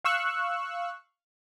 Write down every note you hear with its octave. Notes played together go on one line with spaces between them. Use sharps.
F5 C#6 E6 F#6